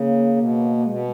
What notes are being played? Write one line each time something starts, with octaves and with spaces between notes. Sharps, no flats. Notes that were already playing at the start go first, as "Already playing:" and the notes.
Already playing: C#3 A#3
B2
B2 G#3